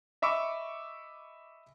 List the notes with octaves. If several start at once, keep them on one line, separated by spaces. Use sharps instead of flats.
D#5 E5 B5 C#6 D6 E6